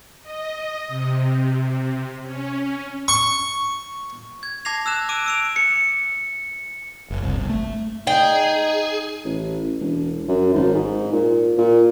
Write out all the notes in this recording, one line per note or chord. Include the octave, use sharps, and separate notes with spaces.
D#5
C3
C#4
C#6
G#6
A5 D6 G#6 A#6 C7 F7
E6 F#6 E7
D6 E6 D7 D#7
E6 D7 F7
C#7
F#1
C2
G1
A3
D#4 G#4 G5
A1
E1
F#2
G#1
G#2
A#2
A#2